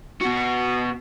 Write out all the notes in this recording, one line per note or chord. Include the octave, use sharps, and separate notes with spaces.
B2 F#4